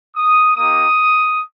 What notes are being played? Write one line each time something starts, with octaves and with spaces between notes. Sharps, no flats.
D#6
A#3 D#4 G4 D#6